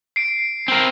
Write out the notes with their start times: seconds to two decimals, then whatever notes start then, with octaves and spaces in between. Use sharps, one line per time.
0.16 C7 D7
0.68 C4 A#4